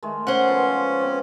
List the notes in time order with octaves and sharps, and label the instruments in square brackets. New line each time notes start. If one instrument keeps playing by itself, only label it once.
[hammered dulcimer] D#3 G#3 A3
[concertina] C#4 [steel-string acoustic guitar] C5 F#5
[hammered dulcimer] F3 B3
B3 C4 D5